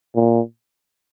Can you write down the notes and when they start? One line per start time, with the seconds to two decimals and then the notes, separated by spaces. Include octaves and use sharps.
0.16 A#2